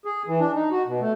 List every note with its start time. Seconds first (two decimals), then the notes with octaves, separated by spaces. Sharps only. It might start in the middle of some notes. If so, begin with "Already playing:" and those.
0.05 G#4
0.27 E3
0.40 D4
0.55 D#4
0.71 F#4
0.87 B2
1.00 A3